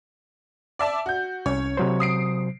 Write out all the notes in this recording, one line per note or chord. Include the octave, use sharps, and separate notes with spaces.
D5 E5 A5
F#4 G6
C2 C#4 C#5
C3 F#3 C5
D#6 C7 D7